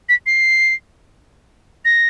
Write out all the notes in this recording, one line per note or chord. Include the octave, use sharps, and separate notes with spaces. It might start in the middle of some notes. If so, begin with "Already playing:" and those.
B6
C7
A#6